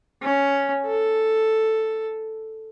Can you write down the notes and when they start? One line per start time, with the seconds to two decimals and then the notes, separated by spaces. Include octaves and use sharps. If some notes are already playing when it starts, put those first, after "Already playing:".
0.23 C#4
0.86 A4